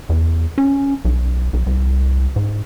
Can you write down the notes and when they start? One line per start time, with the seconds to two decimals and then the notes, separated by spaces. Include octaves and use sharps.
0.09 E2
0.58 C#4
1.05 B1
1.53 B1
1.66 C2
2.36 G#2